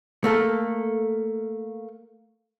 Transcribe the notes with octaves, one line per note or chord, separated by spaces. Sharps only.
A3 A#3 A4 A#4